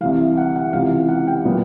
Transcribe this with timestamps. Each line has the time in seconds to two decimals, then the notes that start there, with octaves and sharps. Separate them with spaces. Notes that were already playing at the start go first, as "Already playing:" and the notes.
0.01 C2 C3 E3 F5
0.37 F#5
0.56 F#5
0.73 C#2 C3 E3 F5
1.09 F#5
1.27 G5
1.45 A#2 F#3 B3